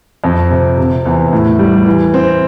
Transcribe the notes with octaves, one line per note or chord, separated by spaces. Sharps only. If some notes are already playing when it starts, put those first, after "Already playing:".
F2
C3
C3
E2
A2
G3
E3
C4